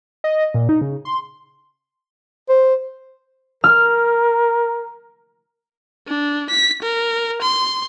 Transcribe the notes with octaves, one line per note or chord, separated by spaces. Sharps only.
D#5
A#2
D#4
C#3
C6
C5
A#4 F6
D4
B6
A#4
C6